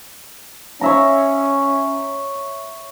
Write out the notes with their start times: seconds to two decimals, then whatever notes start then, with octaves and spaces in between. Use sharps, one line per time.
0.81 C#4 C#5 E5 A#5